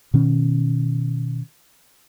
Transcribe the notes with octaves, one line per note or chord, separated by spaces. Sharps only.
B2 D#3 C#4